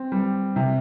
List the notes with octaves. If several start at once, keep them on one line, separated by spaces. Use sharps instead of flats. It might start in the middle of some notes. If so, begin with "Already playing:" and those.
Already playing: C4
G3
C3